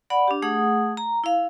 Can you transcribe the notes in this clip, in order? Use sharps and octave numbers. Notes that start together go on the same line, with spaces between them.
D5 F#5 B5
D4 G4
A3 G#4 F#5 D#6
A#5
E4 F5